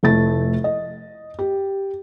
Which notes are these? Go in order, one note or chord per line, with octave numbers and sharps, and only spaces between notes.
F1 A3 E4 A6
D#5
G4